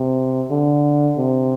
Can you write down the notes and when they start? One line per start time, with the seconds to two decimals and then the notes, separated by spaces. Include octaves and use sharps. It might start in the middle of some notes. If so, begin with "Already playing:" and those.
Already playing: C3
0.50 D3
1.17 C3